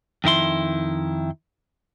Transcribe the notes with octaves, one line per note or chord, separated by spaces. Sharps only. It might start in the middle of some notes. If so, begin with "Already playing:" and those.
F2 D#3 E4 C6